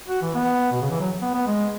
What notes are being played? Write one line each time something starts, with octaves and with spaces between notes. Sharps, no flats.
F#4
E3
B3
B2
C#3
E3
F#3
B3
B3
G#3